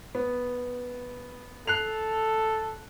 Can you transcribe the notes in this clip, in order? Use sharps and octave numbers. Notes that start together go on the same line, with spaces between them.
B3
A4 F#6 C7 F7